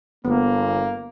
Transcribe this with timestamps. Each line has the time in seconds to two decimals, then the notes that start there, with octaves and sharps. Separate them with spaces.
0.25 G1 A#3 B3